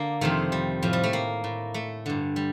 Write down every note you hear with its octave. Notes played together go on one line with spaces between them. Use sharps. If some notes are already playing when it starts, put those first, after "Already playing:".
Already playing: D3 A#3 D4
F2 C3 D#3 A3
G3
A2 F3
G3
A3
A#3
A2
A3
G2 D3
G3